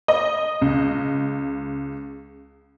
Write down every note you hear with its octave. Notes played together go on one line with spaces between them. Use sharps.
D#5
C#2